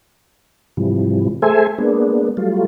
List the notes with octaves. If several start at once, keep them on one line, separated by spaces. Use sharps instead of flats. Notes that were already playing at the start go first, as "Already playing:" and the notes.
G#2 C3 E3 F3 G3
A3 G#4 A4 C5 E5 G#5
G#3 A#3 B3 D4
F#3 G3 A3 F4